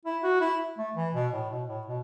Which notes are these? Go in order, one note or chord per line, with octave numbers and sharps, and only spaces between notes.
E4
F#4
E4
A3
E3
B2
A2
B2
A2
B2